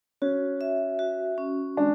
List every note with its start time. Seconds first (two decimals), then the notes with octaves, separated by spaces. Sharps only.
0.22 C#4 F#4
0.61 E5
0.99 F#4
1.38 C#4
1.77 G#3 D4